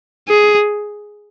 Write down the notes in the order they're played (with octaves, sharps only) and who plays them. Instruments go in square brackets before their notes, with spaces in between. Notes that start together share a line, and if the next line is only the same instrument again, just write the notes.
[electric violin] G#4